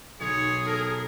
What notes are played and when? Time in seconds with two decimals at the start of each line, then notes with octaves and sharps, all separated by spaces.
0.20 B1 G#4 C#5
0.66 A4 A#4